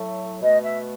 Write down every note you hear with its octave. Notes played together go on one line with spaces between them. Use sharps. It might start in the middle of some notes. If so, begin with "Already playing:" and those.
Already playing: A2 F#3 A3
B2 A3 D#5
E5